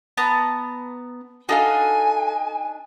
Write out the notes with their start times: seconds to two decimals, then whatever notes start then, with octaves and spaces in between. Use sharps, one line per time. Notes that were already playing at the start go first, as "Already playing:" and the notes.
0.17 B3 A5 A#5
1.49 D4 D#4 F#4 A4 F5 G#5